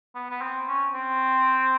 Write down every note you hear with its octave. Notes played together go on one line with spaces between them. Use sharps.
B3
B3
C4
C#4
C4